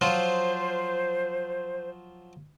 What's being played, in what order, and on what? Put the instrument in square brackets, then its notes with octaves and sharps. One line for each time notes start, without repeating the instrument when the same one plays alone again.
[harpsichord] F3 F#3 F4 [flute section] C5